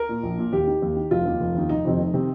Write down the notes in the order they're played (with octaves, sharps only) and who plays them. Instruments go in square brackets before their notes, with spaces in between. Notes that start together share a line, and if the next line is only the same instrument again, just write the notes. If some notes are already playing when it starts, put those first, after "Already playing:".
Already playing: [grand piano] A#4
A#2
A#1
A#2
D#2 G4
D#3
D#2
D#3
F1 F4
D#2 D#3
F1
D#2 D#3
F1 D#4
F2 C3 D#3
F1
C3 D#3